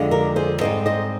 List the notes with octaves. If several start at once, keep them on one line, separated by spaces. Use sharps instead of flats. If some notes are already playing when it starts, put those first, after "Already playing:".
Already playing: F2 D3 G#3
G4 A#4
G#4 C5
G#2 G3 C4 C5 D#5
C5 D#5